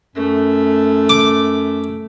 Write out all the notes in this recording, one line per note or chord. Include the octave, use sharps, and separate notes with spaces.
F#2 A3
D6